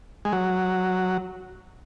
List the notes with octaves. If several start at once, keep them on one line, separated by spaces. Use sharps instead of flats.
G#3
F#3